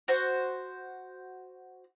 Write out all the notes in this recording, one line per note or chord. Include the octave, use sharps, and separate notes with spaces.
F#4 C5